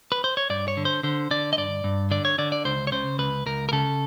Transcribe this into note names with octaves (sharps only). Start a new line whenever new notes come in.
B4
C5
C#5
G2 D5
C#5
D3
C5
D3 C5
D3 D5
D#5
G2 D5
G2
D3 D5
C#5
D3 D5
D5
C#2 C5
C#5
C#3 C5
C#2 B4
C#2 A#4
A#4
C#3 A4